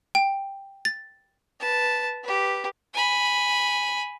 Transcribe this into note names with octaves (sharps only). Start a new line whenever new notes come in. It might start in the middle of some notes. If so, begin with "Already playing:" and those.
G5
A6
B4 A5
G4 B4
G#5 B5